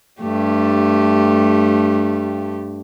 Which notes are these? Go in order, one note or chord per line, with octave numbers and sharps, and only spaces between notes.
G2 A3 G4